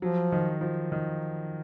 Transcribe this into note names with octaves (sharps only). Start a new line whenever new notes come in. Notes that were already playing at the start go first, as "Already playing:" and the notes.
F3 F#3
D#3
F3
D#3